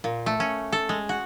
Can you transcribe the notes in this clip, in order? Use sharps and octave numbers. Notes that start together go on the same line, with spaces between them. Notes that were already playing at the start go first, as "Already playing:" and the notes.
A#2
A3
C#4
A4
G#3
F#4